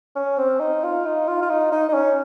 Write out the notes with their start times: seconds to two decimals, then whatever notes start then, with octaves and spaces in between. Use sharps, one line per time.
0.16 C#4
0.38 C4
0.60 D#4
0.84 F4
1.06 D#4
1.28 F4
1.42 F4
1.50 D#4
1.72 D#4
1.89 D#4
1.94 C#4